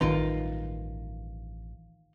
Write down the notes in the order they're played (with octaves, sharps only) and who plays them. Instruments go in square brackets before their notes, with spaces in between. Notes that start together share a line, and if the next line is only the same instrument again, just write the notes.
[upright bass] A1 [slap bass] G2 F#3 G3 [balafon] D#3 [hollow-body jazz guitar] D#4 F4 A#4